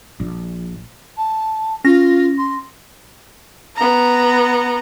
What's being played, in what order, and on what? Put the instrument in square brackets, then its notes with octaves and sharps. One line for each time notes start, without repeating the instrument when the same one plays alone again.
[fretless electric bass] A#1
[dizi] A5
[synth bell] C#4 A#6 [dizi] F4
[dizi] C6
[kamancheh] B3 A#5